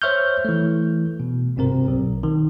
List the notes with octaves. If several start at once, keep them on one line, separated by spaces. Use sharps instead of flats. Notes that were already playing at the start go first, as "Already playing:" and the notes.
C5 C#5 E5 C#6 F6 G6
E3 A3
B2
G#1 G2 C3 C4 A#4
B1
D#3